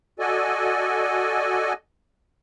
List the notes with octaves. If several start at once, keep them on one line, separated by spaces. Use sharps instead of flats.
F#4 A4 D5 D#5 G#5